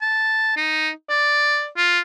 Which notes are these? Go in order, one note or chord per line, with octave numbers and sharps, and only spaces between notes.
A5
D#4
D5
F4